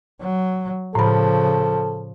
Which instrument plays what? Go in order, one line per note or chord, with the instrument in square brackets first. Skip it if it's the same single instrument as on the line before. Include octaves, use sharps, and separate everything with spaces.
[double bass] F#3
[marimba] A2 B5 [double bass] C#3 F3 [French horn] A4